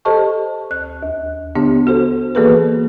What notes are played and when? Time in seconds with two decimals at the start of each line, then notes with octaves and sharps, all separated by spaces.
0.05 G4 A4 C5 D#5 A5 C#6
0.71 D2 F#6
1.03 D#2
1.55 D3 B3 D4 G4
1.87 F#4 A4 C5
2.35 E3 A#3 F#4 G#4 A4 B4